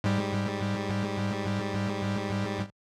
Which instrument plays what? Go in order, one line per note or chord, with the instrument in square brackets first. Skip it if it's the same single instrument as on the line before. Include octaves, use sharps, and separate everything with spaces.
[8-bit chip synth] G#2 G3